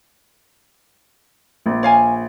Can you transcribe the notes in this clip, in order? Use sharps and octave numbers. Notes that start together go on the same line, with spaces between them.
A#1
C#5 F5 G#5